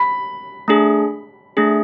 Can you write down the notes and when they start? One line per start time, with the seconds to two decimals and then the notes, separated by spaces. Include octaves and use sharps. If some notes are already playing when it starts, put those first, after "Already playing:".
Already playing: B5
0.68 A3 D4 G#4
1.57 A3 D4 G#4